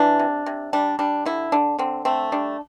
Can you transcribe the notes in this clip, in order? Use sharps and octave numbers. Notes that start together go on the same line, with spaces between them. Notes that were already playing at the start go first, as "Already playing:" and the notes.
Already playing: E3 D4
C3
C3
G3 D4
G3 D4
D3 E4
D3 D4
D3 C4
A3 C4
G3 D4